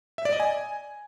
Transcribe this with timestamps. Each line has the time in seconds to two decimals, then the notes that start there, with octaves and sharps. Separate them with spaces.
0.18 E5
0.25 D5
0.33 D#5
0.40 G#5